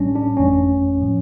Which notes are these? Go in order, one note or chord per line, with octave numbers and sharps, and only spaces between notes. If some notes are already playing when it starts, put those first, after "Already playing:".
Already playing: A1 A2 G3 C#4 D4
D4
G1 F2 E3 A3 C#4
A2 F3